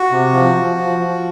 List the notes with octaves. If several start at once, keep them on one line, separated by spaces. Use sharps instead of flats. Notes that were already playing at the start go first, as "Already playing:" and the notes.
Already playing: F#4
C3
F3
F3
F3
F3